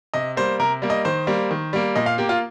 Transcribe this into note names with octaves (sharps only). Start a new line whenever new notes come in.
C3 D#5
G3 A#3 C5
C3 A#4
G3 A#3
D#5
D#3 C5
G3 A#3
D#3
G3 A#3
A#2 D#5
F5
A#3 G4
F4